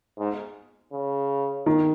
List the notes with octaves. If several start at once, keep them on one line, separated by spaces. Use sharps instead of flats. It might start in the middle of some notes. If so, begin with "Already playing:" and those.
G#2
C#3
D#3